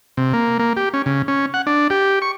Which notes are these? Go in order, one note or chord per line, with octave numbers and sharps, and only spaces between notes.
C3
A#3
A#3
G4
C#4
C#3
C#4
F#5
D4
G4
C#6